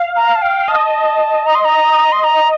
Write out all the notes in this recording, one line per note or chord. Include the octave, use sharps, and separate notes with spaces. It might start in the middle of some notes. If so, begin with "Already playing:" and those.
Already playing: F5
A#5
A5
G5
D#5 A5
A#5
C6
A#5
C6
A#5